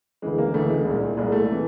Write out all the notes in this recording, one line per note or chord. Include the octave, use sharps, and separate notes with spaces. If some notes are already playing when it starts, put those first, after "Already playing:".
D2 C#3 E3 G#3
A#3
D2 C#3 E3 A3
G#3
C2 A#2
C2 A#2 G#3
A3
C3 E3